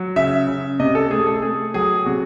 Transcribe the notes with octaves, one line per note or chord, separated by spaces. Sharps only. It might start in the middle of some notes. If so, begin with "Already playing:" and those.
Already playing: F#3
C#3 E5
C#3
C3 D#5
A4
A3 G#4
A4
A3 G#4
F#3 G#4
C3 F#4